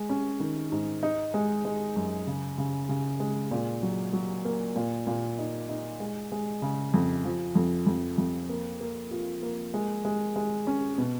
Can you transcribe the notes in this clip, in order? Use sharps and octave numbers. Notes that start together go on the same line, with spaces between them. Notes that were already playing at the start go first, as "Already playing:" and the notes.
Already playing: G#3
C#4
D#3
G#2
D#4
G#3
G#3
F#2
C#3
C#3
C#3
G#3
A#2
F#3
F#3
A#3
A#2
A#2
D#4
D#4
G#3
G#3
C#3
F2
F3
F2
F2
F2
A#3
A#3
F4
A#3
G#3
G#3
G#3
C#4
B2